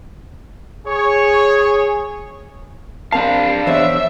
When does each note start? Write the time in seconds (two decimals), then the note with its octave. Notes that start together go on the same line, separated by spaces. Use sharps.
0.87 G#4 C#5
3.12 C4 D4 A#4 F5 A5
3.67 E2 C5 C#5 E5